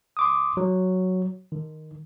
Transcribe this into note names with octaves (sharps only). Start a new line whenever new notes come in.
C6 D6 D#6
F#3
D#3